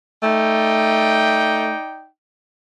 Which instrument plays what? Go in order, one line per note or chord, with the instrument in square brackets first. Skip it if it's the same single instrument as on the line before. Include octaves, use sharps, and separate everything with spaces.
[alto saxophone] A3 [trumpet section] D#4 D5 G5